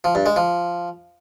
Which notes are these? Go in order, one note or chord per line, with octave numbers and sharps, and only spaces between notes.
F3
G2
G#3
F3